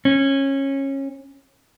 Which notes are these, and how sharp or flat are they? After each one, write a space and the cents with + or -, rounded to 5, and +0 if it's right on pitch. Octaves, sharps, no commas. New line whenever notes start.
C#4 -20